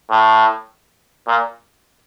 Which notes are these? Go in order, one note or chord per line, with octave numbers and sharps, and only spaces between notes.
A2
A#2